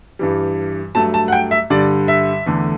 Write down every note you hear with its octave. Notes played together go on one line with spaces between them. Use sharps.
G2 E3 G3
G2 F#3 A3 A5
A5
F#5
G5
E5
G2 D3 G3 D5
E5
E2 D3 A3